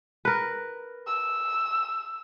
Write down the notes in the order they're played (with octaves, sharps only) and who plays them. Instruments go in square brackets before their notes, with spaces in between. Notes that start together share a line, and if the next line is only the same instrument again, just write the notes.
[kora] A#4 B4
[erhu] E6